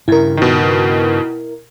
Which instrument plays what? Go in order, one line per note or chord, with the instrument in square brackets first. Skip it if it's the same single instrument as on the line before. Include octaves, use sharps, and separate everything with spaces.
[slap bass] G2 C#3 [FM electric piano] E4 A#4
[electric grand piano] B2 D#3